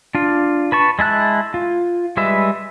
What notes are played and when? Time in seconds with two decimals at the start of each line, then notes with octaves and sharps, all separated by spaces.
0.15 D4 F4
0.72 B4 A5 C#6
0.99 G#3 E4 A5 F#6
1.54 F4
2.17 G3 G#3 B4 E5